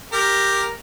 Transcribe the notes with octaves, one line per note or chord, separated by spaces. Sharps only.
G4 A#4